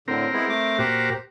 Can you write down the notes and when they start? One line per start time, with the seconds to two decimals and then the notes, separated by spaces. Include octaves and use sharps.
0.08 A2 D3 C4 A#4
0.33 G#3 B3 E4
0.50 A3 D6
0.79 A#2 F#4 G4 A#4 C5